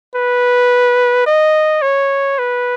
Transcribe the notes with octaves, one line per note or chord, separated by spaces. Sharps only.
B4
D#5
C#5
B4